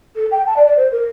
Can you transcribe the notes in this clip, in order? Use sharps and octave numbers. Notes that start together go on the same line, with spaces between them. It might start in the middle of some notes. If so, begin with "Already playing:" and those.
A4
G5
A5
D5
D5
C5
A#4